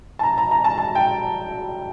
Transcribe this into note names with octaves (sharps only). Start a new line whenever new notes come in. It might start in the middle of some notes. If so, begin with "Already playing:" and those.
A5
A#5
A#5
A#5
A5
A5
G5